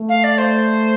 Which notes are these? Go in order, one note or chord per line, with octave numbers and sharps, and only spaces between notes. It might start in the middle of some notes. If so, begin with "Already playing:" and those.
Already playing: A3
F5
D5
C5